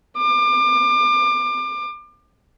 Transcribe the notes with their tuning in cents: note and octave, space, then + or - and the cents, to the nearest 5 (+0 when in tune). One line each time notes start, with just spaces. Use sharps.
D6 +30